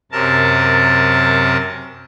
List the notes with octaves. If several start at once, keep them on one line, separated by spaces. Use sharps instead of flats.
F#2 C3 A#4 A5